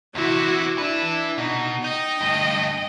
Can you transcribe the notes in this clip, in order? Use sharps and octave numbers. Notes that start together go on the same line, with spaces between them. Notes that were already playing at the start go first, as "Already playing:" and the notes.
E2 C3 E4 F#4
D4 E4 B4 E5
B2 D#4
D#4 D#5 G5
D2 G2